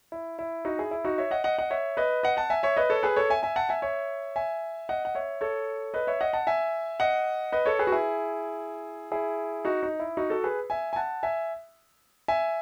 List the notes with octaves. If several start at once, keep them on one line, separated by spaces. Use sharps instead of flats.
E4
E4
D#4 F#4
E4 G#4
E4
D#4 F#4
C#5 E5
D#5 F#5
D#5 F#5
D#5 F#5
C#5 E5
B4 D#5
D#5 F#5
F#5 A5
E5 G#5
C#5 E5
B4 D#5
A4 C#5
G#4 B4
A4 C#5
E5 G#5
E5 G#5
F#5 A5
E5 G#5
C#5 E5
E5 G#5
D#5 F#5
F#5
C#5 E5
A4 C#5
B4 D#5
C#5 E5
D#5 F#5
F#5 A5
E5 G#5
D#5 F#5
B4 D#5
A4 C#5
G#4 B4
F#4
E4 G#4
E4 G#4
D#4 F#4
D#4
E4
D#4 F#4
F#4 A4
G#4 B4
E5 G#5
G#5
F#5 A5
E5 G#5
E5 G#5